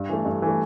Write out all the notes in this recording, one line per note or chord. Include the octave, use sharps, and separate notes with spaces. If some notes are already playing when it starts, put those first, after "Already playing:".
Already playing: G2
E3 A3
G2
E3
A3